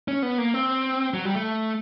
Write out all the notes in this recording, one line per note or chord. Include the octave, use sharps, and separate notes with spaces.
C#4
B3
A#3
C4
F#3
G3
A3